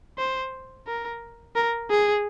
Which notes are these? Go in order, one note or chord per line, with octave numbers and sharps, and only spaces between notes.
C5
A#4
A#4
G#4